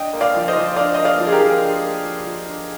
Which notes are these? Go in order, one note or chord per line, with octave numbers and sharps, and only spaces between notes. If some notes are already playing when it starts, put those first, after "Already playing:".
Already playing: D4 D#5 G5
A#3
D5 F5
F3
C5 D#5
F3
D4 D5 F5
A#3 D#5
D5 F5
F3
G#4
G4 A#4
F3
D4
A#3
F3
F3
D4